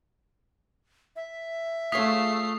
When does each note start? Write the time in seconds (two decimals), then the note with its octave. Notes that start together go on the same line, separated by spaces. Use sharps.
1.16 E5
1.92 A3 F4 G#4 C#5 D#6 B6 C7